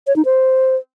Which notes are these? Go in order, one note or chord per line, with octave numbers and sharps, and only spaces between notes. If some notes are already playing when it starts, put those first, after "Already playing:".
C#5
D#4
C5